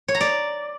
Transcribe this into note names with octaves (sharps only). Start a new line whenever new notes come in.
C#5
A#5
D5